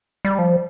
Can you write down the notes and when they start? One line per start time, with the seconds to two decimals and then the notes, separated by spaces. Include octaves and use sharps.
0.25 G3
0.39 F3